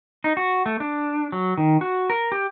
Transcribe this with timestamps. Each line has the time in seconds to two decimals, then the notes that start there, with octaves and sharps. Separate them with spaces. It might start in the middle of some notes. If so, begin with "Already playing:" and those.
0.24 D#4
0.37 F#4
0.66 A3
0.80 D4
1.32 F#3
1.57 D#3
1.81 F#4
2.10 A#4
2.32 G4